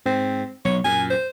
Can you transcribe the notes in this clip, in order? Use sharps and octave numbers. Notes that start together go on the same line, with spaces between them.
G#2 C4
B1 C#5
F#2 A#2 G#5
C5